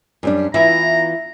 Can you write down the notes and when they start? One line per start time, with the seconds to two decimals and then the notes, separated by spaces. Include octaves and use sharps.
0.23 F#2 G3 D4
0.54 E3 B3 E4 F4 A#5